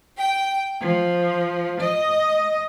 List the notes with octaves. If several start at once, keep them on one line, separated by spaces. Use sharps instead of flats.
G5
F3
D#5